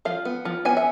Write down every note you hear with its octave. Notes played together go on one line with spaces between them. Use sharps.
F3 F5
B3
F3
B3 G#5
E5